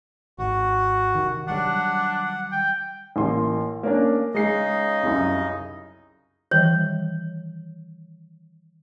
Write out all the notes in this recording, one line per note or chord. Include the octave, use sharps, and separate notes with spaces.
G#1 F#4
C3 D#3
D#3 F#3 G3 D4 F#5
G5
A1 A#3 C6
A#3 C#4 D4
C#3 G#3 D#4 D#5 C7
C2 F#2
D#3 E3 G3 C#5